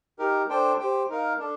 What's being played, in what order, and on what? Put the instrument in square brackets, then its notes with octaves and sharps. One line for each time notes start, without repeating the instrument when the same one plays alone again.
[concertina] D#4 G4 A#4
D4 A4 C5 G5
G4 C5 G5
D#4 A#4 F5
D4 A4